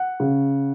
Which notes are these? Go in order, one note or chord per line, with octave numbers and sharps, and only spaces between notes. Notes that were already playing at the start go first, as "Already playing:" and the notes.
Already playing: F#5
C#3